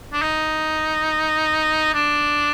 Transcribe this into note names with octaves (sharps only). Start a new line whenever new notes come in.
D4
D#4
D4